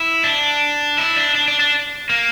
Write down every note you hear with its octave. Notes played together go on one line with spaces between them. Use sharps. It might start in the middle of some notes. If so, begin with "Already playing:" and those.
Already playing: E4
D4
E4
D4
D4
D4
D4
A#3